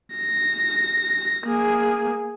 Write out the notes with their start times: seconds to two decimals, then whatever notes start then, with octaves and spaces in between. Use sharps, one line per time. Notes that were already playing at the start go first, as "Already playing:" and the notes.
0.16 A#6
1.46 A#3 G#4